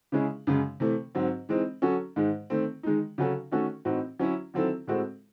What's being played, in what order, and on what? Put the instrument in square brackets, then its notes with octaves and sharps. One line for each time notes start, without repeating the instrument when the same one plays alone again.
[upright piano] C#3 G#3 C#4 E4 G#4
F#2 C#3 G#3
C3 E3 A3
G#2 F#3 C4
E3 G#3 C4 D#4
F#3 C#4 F#4 A4
G#2 D#3 G#3
D#3 A3 C4
D#3 G#3 D#4
C#3 F#3 C#4 F#4 A4
D#3 A3 C#4 F#4 A4
A2 E3 C4 D#4 F#4
F#3 C#4 E4
D#3 F#3 C4 E4 A4
A2 G#3 C4 F#4 A4